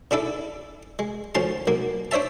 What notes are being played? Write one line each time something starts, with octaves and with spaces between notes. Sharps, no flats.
C#3 D4 E4 A4
G#3
D2 F3 C#4 A5 C6
B1 A#3
D4 C5 C#5 E5 A5